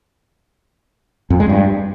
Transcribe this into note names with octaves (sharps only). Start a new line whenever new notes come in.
F2
G#3
G2